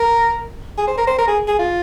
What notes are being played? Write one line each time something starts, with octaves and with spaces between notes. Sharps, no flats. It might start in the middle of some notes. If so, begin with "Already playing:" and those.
Already playing: A#4
G#4
C5
A#4
C5
A#4
G#4
G#4
F4